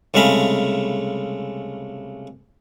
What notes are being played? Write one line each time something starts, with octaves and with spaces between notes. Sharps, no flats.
C2 C#3 G#3 A3 F5 B5